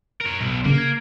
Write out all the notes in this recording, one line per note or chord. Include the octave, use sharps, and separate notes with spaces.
A#4 C#5
B1
C#3 A#3
G#6